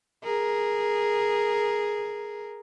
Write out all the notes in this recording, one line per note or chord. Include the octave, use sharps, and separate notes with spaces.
G#4 A#4